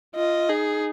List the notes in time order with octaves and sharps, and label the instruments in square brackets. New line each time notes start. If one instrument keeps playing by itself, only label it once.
[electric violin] F4 [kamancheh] D#5
[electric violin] D#4 [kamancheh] G#4